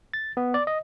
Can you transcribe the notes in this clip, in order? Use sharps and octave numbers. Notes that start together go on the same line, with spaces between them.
A6
B3
D5
D#5